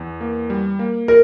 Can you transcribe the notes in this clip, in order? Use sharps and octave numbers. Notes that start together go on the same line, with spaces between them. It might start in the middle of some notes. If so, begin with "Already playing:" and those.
Already playing: E2
A#3
G3
A#3
A#4